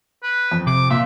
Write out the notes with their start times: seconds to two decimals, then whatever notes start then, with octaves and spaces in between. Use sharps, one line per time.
0.23 B4
0.51 F2
0.67 C3 D6
0.90 A#2 E5